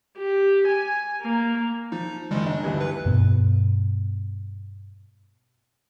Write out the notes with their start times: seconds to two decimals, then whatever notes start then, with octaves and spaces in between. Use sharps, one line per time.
0.18 G4
0.67 G#5
1.21 A#3
1.92 F3 D#4
2.31 F#1 D#3 G3 G#3
2.46 D4 D#4
2.63 D2 G2 E3
2.81 B4
3.06 G2 B2 B3